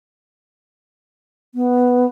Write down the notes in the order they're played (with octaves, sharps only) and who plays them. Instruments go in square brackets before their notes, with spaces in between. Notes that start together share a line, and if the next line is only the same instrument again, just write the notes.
[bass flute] B3